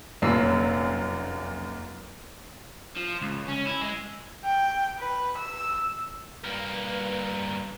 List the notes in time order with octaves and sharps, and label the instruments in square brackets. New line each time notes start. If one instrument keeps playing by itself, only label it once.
[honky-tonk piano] F1 F#2 A#2 E6 C7
[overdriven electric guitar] F3
C#2
C#4
E4
G#3
[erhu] G5
B4
E6
[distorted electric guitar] G2 A#3 [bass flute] B4